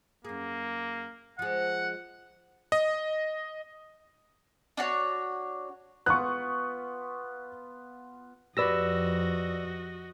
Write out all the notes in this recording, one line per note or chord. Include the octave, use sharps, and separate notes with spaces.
F#2 A#3 G#4
F3 G#3 F#5
D#5
D4 F#4 C#5
B3 F4 C#6 F#6
F2 F#4 G4 B4 D5 D#5 E6 A#6